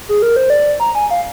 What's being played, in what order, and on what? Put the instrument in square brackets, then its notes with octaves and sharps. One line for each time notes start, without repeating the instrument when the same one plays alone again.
[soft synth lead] G#4
A#4
C5
D5
A#5
G#5
F5